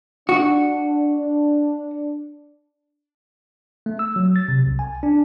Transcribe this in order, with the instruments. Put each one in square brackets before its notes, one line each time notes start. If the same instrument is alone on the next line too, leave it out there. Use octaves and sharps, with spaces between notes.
[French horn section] D4 [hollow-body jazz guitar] F#4
[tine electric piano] A3
E6
F#3
A6
C3
C2
G#5
D4